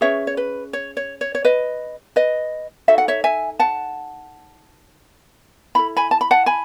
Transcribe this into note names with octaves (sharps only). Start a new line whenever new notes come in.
C#4 G#4 B4 C#5 E5
C#5
B4
C#5
C#5
C#5
C#5
B4 D#5
B4 D#5
D#4 F#4 A4 E5
F#5
C#5 E5
E5 G#5
F#5 A5
E4 A4 B5
G#5 B5
A5
B5
F#5 A5
G#5 B5